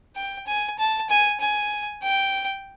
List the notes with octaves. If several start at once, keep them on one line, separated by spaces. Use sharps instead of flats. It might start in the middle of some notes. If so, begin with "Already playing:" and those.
G5
G#5
A5
G#5
G#5
G5